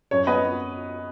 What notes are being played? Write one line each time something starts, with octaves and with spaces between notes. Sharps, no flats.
F#2 C#5
B3 B4 D#5